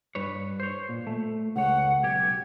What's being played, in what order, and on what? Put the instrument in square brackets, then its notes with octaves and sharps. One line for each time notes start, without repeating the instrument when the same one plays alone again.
[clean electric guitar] G2 B4 C#5
C5 C#5
A#2
A3
[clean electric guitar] C#2 C#5 [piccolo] F#5
[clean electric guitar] B1 G4 [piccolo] G#6